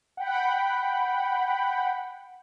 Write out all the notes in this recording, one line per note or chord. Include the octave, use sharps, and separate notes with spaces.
F#5 G5 B5